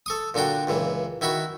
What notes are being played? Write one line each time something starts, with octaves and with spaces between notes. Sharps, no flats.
A4 C#6 D#6
A#2 D3 D4 F#4 G5
C#2 A#2 E3
D#3 E4 F#4 B5 C#6